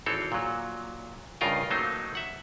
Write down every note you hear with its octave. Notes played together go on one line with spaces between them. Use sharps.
G#1 E3 C4 A4 C#5
A#2 F#3
C#2 G2 C#3 F4 A#4 D#5
F#3 A3 A#3 D#4 C5
E5 F#5